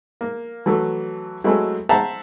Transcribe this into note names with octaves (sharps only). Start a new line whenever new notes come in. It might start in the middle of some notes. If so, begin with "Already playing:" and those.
A#3
E3 F#3 A3
F#3 G#3 A3 C4 E4 G#4
C5 E5 F#5 A5 A#5